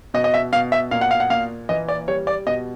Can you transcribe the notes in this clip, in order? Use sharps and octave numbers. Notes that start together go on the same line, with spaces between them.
B2 D#5
D#5
E5
B2 F5
E5
A#2 F5
F#5
F5
F#5
A#2 F5
E3 D#5
D5
G3 C#5
D5
B2 D#5